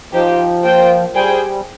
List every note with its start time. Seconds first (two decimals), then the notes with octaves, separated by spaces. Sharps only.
0.13 F3 D#4 G4 C5 G5
0.64 A#3 F4 C5 G5
1.15 G3 G#4 C5 G5